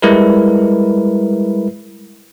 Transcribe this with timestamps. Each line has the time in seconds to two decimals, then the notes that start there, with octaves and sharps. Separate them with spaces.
0.02 G3 G#3 E4 A#4 B4